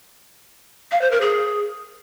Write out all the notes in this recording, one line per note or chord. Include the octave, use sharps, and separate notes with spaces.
F5
C5
A#4
G#4